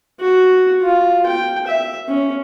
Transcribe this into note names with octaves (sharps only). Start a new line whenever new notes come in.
F#4
F4
G5
E5
C#4